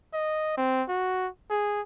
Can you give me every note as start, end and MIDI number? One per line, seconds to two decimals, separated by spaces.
0.13 0.53 75
0.57 0.83 60
0.88 1.28 66
1.50 1.81 68